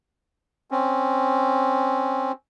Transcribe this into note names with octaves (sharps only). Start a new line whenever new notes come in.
C4 C#4